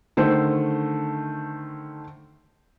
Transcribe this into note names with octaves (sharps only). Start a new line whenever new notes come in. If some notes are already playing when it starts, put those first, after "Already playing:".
D3 D#3 A3 C5